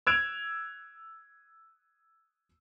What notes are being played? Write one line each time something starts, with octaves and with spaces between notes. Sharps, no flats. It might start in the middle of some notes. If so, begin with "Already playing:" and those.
E6 F#6 G#6 D7 E7 F7